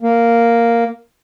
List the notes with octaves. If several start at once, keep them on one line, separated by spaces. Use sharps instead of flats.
A#3